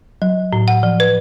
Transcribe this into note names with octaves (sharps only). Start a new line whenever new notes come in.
F#3
A2
F#5
F3
B4